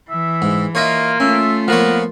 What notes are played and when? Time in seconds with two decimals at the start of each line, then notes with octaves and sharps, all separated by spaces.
0.10 E3 E5
0.42 G#2
0.75 A#3 F4 C#5 D#5 E5
1.20 A3 C#4 F4 E5
1.68 F3 A#3 B3 A#4 C#5